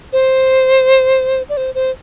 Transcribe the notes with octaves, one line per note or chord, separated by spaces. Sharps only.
C5
D5
C5
C5